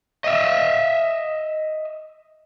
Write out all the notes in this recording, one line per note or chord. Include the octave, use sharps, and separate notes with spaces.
D#5 E5